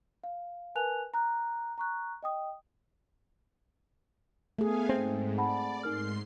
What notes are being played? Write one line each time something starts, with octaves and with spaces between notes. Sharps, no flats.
F5
A#4 B4 G#5 A5 F#6 F7
A#5 F#6
A#5 C#6 F#6
D#5 G5 D#6
A3 B3 G#4 F5 G#5
G#2 C4
D5 F#5 A5 B5
G#2 D#4 A#4 C6 F6 C7